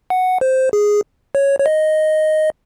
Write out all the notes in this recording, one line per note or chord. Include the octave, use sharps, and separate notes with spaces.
F#5
C5
G#4
C#5
C#5
D#5